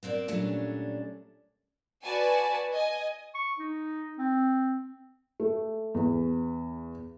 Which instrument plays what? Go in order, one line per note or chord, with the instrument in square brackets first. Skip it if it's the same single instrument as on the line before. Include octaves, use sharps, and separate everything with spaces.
[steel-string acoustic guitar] B3 C4 A#4 D5
A#2 F#3 G3 A3 C#4 D4
[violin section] F#4 B4 D5 G#5 A5
D#5 G#5
[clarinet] C#6
D#4
C4
[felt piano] A3
E2